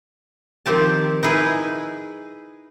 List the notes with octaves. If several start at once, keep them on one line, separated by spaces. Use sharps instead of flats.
D#3 F3 C4 G4 A5
D#4 E4 G#4 B4